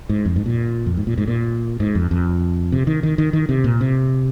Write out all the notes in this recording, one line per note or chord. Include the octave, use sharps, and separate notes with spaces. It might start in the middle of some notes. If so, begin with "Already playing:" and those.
G#2
F2
G#2
A#2
F2
G#2
A#2
G#2
A#2
G#2
F2
F2
C3
D#3
D#3
D#3
D#3
C3
A#2
C3